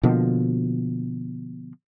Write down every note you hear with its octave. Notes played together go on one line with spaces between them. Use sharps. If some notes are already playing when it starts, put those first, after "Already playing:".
B2 D3 F3 A#3